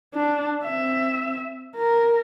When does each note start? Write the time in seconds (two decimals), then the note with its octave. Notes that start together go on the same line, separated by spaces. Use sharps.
0.14 D4
0.65 C4 E5
1.76 A#4